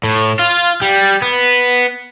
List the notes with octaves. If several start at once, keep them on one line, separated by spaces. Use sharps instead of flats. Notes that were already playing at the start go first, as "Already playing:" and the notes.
A2
F4
G3
B3